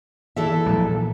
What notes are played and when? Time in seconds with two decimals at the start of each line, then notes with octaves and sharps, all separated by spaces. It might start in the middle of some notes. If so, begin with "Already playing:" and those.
0.36 E3 A4 E5
0.66 A#2 F3 F#3